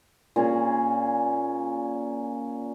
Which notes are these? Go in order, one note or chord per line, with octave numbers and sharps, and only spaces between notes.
A#2 C#4 G#4